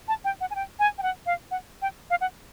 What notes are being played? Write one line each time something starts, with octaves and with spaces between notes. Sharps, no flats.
A5
G5
F#5
G#5
G5
G#5
G5
F#5
F5
F#5
G5
F5
F#5